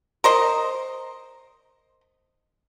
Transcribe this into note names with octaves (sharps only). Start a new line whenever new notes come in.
A#4 C5 D#5